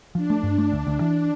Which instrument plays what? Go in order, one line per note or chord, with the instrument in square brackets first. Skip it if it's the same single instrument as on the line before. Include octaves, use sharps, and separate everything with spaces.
[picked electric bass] F3 [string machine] D4
[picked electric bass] A3
G2
A3
D2
D2
E3